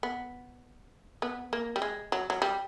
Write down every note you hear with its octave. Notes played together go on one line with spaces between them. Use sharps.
B3
B3
A#3
G3
G#3
F#3
F#3
G3